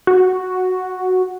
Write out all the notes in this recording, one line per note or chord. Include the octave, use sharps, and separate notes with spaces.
F#4